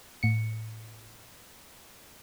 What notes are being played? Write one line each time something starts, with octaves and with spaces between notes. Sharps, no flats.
A2 C#7